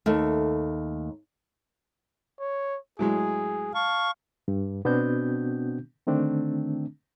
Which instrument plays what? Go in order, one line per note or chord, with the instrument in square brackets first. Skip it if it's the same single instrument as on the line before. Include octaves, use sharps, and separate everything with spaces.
[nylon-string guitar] D#2 A3
[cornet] C#5
[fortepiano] A2 F#3 G#3 [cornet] G#4
[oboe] F5 [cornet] A5 [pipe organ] C#6
[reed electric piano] G2
B2 B3 C4 D4 F#4 G6
D3 D#3 A3 C4 D4